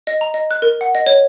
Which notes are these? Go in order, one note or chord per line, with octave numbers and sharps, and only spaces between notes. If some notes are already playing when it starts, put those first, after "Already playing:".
D#5
A#5
D#5
F#6
A#4
F#5
D#5
C#5